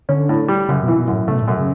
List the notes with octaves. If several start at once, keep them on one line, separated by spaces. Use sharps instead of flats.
D3 C#4
A2
G3
F#2 C#3
B2 E3
B2
F#2 A2
C#3 A3
B2
A2
F#2 B2
C#3